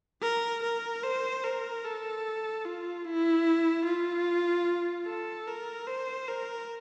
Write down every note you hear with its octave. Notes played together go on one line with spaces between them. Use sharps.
A#4
A#4
C5
A#4
A4
F4
E4
F4
A4
A#4
C5
A#4